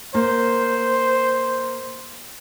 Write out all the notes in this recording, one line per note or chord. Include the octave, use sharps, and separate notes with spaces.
A#3 C5